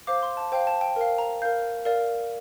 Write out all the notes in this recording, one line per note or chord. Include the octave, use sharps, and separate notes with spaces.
C5 F5 D6
C6
A5
C5 F5 G5
A5
G5
A#4 F5
A#5
A#4 F5 G6
A#4 D5 F5